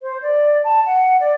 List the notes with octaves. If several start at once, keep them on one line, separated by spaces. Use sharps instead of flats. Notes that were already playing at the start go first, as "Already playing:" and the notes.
C5
D5
A5
F#5
D5